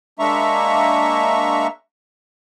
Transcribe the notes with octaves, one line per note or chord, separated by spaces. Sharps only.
G#3 A#3 D4 E5 A#5 C#6